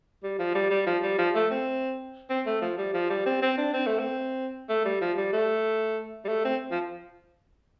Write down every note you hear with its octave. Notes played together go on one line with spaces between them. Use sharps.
G3
F3
G3
G3
F3
G3
F3
A3
C4
C4
A3
F3
G3
F3
G3
C4
C4
D4
C4
A3
C4
A3
G3
F3
G3
A3
G3
A3
C4
F3